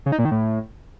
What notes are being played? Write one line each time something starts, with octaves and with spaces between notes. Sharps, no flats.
C#3
D#4
A#2
D#3
A2